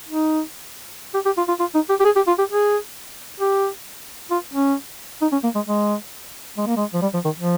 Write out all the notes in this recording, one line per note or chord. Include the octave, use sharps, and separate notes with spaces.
D#4
G4
G4
F4
F4
F4
D#4
G4
G4
G#4
G4
F4
G4
G#4
G4
F4
C#4
D#4
C#4
A#3
G#3
G#3
G#3
A#3
G#3
F3
G3
F3
D#3
F3